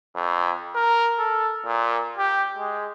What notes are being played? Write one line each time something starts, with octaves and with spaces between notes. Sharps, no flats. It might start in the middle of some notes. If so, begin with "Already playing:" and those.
F2
A#4
A4
A#2
G4
G#3